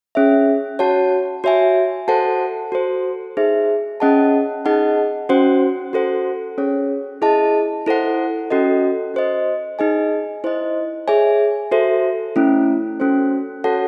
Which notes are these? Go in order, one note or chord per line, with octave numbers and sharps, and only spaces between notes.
C#4 G#4 C#5 E5
F#4 C#5 F#5 A5
F#4 C#5 E5 G#5
F#4 A4 C5 F#5 A5
F#4 A4 C5
D#4 G#4 C5 E5
C#4 G#4 D#5 F#5 A5
D#4 G#4 D#5 F#5 A5
C#4 F#4 C5 F#5
F#4 A4 C5 F#5
C#4 G#4 C#5
E4 G#4 D#5 A5
E4 A4 C5 F#5
C#4 F#4 A4 D#5
F#4 C5 D#5
D#4 G#4 D#5 G#5
E4 C5 D#5
G#4 C#5 E5 G#5
F#4 A4 C5 E5
A3 C#4 E4
C#4 F#4 A4 C5
F#4 A4 C#5 F#5 A5